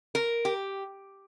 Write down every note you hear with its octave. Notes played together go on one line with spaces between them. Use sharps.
A#4
G4